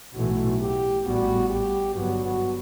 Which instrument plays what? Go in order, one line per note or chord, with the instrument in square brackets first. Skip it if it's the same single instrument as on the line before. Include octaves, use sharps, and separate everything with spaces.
[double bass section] B1 A2 E3 A3 [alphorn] F#4
[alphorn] G4
[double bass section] A1 A2 G3 B3 [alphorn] F#4
[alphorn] G4
[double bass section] G1 G2 F#3 B3 [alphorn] F#4
[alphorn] F#4